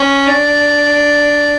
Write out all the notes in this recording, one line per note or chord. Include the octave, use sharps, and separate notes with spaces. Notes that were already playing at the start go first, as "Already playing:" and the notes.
Already playing: C#4
D4